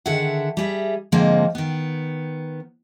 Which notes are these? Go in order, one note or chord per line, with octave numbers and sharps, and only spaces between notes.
D3 D#3 G#4 E5 F#5
G3 G#4 E5
G#2 D3 F3 G#3 A#3 C4
D#3 B3